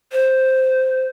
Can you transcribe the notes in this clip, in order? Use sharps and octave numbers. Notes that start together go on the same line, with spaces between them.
C5